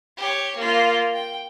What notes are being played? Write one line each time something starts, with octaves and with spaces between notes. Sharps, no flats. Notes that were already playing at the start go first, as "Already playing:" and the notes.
G4 C#5
A#3 F4
G5